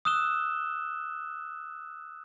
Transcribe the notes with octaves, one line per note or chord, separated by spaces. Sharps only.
D#6 E6 F#6 E7 G7